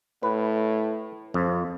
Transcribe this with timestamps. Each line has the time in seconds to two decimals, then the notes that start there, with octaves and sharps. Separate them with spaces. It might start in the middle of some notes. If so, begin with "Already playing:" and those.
0.23 A2 B4
1.34 F2 F3